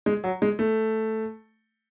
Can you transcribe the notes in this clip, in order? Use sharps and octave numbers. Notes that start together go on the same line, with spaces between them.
G#3
F#3
G#3
A3